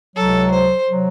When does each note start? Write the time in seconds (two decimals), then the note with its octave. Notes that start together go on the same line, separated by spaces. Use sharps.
0.16 C#2 C3 F#3 A4
0.51 C5
0.87 C3 F#3